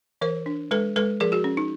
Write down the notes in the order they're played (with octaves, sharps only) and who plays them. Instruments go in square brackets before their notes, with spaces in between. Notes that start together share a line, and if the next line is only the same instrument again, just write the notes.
[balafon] E3 A#4 C5
D4
G#3 A4 B4
G#3 A4 B4
F3 G#4 A#4
F#4 G#4
C#4
D#4